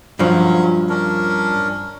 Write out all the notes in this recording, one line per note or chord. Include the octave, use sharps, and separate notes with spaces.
G2 F3 F#3 C#4
C#4 D4 A#4